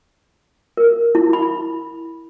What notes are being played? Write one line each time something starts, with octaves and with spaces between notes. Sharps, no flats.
A#4
E4
B5